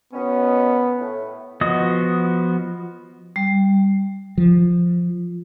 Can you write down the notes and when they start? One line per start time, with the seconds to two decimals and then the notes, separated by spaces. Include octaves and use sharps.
0.13 B2 D#3 B3 C#4
0.99 A2
1.61 F3 B3 F#4 D#5 D#6
3.36 G3
4.38 F3